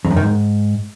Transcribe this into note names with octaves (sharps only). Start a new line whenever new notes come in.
F2
F#2
D#3
G#2